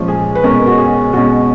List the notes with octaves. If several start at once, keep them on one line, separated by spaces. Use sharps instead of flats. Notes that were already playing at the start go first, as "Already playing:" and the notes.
Already playing: A#2 F3 G#3 C#4
G#4
B4
B2 G#3 C#4 A#4
F#4
G#4
B2 G#3 C#4 F#4